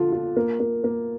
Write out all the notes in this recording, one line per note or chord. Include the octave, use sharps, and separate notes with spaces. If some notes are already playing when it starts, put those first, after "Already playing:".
Already playing: D3 F3 F4
F4
A#3
A#3
A#3